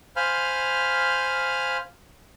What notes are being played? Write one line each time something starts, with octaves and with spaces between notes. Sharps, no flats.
C5 F5 G#5 B5 F6